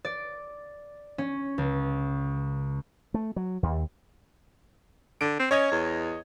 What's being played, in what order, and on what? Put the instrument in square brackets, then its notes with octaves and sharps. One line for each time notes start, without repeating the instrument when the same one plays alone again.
[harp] D5
C#4
C#2
[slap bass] A3
F#3
D#2
[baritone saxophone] D3 [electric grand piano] D7
[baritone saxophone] C4
[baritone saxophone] C#4 [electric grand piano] C#5 D#5 G#6
[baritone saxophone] E2